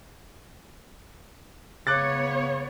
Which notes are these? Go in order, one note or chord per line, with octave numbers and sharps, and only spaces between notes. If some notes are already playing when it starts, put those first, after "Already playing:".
C#3 B3 C#5 D6 F#6 A6